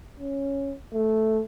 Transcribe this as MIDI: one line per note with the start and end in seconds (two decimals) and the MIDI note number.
0.20 0.74 61
0.94 1.41 57